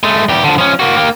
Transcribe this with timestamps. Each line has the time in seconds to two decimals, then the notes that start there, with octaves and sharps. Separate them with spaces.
0.03 G#3 A3
0.29 E2 G4
0.44 D3 F3
0.58 F3 C#4
0.80 A#3 F#4
0.97 A#3 G4